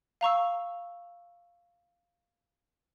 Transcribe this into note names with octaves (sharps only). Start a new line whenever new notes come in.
F5 A#5 C#6 E6